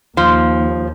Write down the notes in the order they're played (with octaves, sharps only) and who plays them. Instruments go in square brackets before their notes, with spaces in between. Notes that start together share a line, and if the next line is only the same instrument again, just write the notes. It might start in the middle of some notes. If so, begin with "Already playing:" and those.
[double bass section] D#2 [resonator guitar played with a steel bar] F3